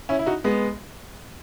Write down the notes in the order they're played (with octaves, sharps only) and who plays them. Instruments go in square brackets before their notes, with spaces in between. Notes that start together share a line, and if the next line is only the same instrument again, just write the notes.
[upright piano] C#4 E4
E4
D#4 F#4
G#3 B3